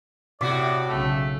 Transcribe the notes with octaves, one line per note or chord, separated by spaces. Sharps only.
A2 C3 F#4 D5 D6 B6
B1 C#3 A3